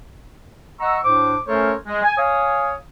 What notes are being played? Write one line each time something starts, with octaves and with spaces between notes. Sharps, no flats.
D#5 F#5 A#5 C#6 E6
A2 D4 C5 D6
A3 C#4 A4 A#4 C5 C#5
G#3
G#5
C#5 F5 G#5 D#6